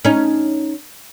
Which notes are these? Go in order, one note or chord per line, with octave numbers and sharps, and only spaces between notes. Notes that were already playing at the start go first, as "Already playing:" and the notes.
C#4 D#4